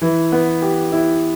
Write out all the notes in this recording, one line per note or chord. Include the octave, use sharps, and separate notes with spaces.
E3
B3
G4
E4